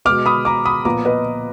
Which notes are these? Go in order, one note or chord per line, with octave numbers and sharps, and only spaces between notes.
B2 G#3 B3 D6 F6
B5 D#6
A#5 D6
B5 D#6
A#2 F3 B3 A#5 D6
B4 D#5